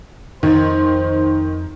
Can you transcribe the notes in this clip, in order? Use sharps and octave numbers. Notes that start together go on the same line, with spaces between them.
F2 D#3 C5